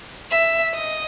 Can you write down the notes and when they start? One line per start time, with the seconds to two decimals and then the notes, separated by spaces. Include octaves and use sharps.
0.31 E5
0.74 D#5